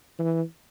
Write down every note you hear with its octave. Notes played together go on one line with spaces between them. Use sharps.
E3